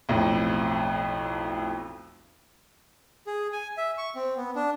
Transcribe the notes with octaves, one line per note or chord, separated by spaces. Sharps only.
B1 F2 A2
G#4
G#5
E5
C#6
C4
B3
D4